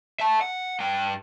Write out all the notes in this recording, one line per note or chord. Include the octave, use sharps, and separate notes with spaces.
E5 A5
F#5
G2 G5